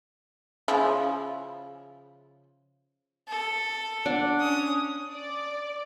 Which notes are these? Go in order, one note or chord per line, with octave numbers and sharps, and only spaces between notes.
C#3 F3 E4
A4
D4 F#5
C#4 D#6
D5